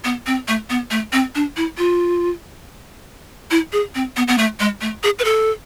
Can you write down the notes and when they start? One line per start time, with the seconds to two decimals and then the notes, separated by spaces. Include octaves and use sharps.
0.04 B3
0.26 C4
0.48 A3
0.70 B3
0.91 A3
1.13 C4
1.35 D4
1.57 E4
1.78 F4
3.51 E4
3.73 G#4
3.95 C4
4.16 B3
4.28 B3
4.38 A3
4.60 G#3
4.81 A3
5.03 G#4
5.19 B4
5.25 A4